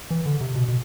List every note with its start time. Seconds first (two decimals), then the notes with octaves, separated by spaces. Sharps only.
0.10 E3
0.26 D3
0.41 C3
0.55 B2
0.68 B2